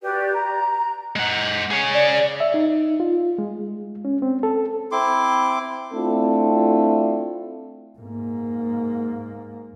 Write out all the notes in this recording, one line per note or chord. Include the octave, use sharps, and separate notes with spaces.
F#4 G4 B4 D5
A#5
G#3 F#5
G#4 C#5
D5
E5
D#4
F4
G#3
C#4
C4
A4
C4 E4 C6 D6
A3 C4 D4 E4 F4 A4
G#2 A#3